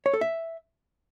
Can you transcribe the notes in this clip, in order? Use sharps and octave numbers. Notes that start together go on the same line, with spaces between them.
C#5
A4
E5